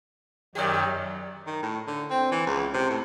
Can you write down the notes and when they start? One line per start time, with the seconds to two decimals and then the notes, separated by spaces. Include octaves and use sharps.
0.55 F#2 D#3 F#3 G4 D5
1.47 D#3
1.63 A2
1.87 D3
2.10 C4
2.31 E3
2.47 C#2
2.74 C3
2.90 A2